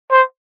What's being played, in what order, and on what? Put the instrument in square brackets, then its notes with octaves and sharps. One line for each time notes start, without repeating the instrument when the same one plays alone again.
[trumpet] C5